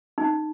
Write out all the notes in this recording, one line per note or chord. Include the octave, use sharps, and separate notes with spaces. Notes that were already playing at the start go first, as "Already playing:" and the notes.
D#4